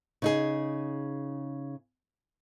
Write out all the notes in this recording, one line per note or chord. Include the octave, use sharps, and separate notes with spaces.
C#3 D#4 G#4